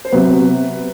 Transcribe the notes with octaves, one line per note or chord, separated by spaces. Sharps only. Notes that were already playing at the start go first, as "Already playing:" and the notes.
C5
C3 F#3 B3 B4